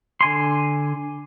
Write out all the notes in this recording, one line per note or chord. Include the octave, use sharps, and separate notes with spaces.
D3 G#5 C6